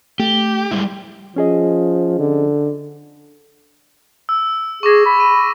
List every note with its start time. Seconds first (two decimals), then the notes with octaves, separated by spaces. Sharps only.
0.20 A3 G4
0.71 G3 G#3 E4
1.36 F3 C#4 G#4 D#5
2.19 D3
4.29 E6
4.83 G#4 C#6 D6 A#6
5.06 B5
5.20 D#7